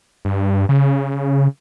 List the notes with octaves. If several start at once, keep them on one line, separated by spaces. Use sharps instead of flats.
G2
C#3